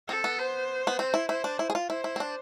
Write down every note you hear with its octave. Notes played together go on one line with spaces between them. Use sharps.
C4 A4
B3
C5
B3
C4 C5
E4
E4 C5
D4
E4
G#4
F4
E4 C5
E4
C4
D4